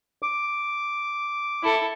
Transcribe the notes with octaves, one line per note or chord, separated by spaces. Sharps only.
D6
E4 A4